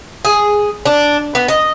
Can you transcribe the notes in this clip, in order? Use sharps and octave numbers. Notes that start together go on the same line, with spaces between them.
G#4
D4
B3
D#5